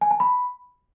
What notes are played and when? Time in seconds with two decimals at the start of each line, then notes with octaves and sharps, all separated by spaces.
0.01 G#5
0.11 A5
0.20 B5